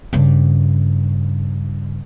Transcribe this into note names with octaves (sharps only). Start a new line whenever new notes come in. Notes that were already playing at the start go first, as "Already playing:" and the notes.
G2 C#3